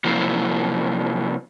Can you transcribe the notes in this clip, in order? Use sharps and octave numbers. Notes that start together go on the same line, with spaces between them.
C3 F3 F#3 A#3 E4